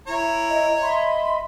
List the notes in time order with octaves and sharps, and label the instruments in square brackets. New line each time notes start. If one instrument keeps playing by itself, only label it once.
[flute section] E4 [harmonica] C#5 A#5
[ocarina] D#5
[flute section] D#5 E5 B5 [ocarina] C6